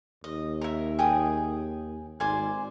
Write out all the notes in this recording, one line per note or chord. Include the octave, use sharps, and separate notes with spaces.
D#2 D#5
A#4 E5
G#4 G5 D#6
G#1 C5 D5 G#5